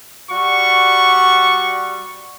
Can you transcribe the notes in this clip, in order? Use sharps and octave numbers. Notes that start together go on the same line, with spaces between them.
G3 F#4 C#6